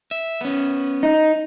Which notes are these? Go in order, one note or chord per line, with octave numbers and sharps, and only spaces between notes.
E5
B3 C#4
D#4